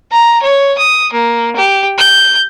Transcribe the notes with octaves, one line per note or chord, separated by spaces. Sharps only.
A#5
C#5
D#6
A#3
G4
G6